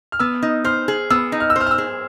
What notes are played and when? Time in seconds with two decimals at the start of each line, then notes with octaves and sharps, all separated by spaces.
0.12 F6
0.19 B3 E6
0.42 D#4
0.64 C5 F6
0.88 G#4
1.10 B3 E6
1.32 D#4
1.40 F6
1.50 E6
1.56 C5 F6
1.67 F6
1.71 E6
1.78 G#4